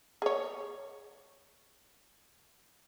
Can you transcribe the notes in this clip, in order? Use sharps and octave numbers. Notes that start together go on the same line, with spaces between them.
G#4 C#5